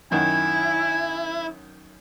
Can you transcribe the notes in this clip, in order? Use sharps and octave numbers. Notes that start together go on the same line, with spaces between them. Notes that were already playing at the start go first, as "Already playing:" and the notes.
F#2 D#3 E4 G#5